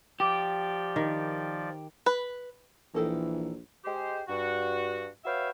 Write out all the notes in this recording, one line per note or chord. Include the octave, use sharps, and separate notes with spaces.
F3 G4 D5 D6
D#3
B4
A#1 D#3 E3 A4 A#4
G#3 G4 C5
G2 F#4
F#4 B4 C#5 E5 F5 G5